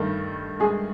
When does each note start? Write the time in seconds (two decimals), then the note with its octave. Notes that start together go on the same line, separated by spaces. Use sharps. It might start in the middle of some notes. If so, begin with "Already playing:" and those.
Already playing: G2 D#3 A3
0.60 G#3 G#4